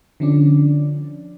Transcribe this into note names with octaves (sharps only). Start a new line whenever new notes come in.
D3 F3 C#4 D4 D5